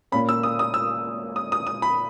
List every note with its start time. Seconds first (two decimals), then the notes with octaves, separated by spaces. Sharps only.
0.12 A#2 A#3 C#4 B5
0.29 E6
0.43 D#6
0.59 D#6
0.74 E6
1.36 D#6
1.52 D#6
1.67 D#6
1.82 B5